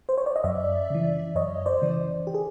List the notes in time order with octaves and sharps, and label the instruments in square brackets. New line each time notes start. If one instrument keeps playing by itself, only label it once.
[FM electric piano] C5
C#5
D5
D#5
F#2 D5 E5
C#3 E3
F#2 C#5 D#5
C5 D5
C#3 E3
G4
G#4